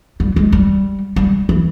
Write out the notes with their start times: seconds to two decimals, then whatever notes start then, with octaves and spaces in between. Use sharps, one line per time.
0.20 G3
0.36 G#3
0.52 G3
1.16 G3
1.49 E3